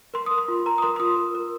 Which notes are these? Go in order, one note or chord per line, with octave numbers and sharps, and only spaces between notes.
A#4 C6
A#4 D#6
C6
F4
A#4 A#5
D#6
A#4 C6
C6
F4 D#6
A#4
A#4